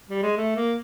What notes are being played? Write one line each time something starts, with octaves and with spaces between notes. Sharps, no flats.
G3
G#3
A3
A#3